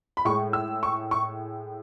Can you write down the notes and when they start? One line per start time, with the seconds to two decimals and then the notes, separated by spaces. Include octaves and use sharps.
0.17 B5
0.25 A2 G#3 C#6
0.53 E6
0.83 C#6
1.11 C#6